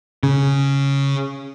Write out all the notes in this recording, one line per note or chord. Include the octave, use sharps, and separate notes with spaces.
C#3